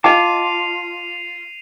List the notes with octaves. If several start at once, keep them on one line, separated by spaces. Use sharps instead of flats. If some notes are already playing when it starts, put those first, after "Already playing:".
F4 D#5 G5 A5 D6 C7 D#7 F7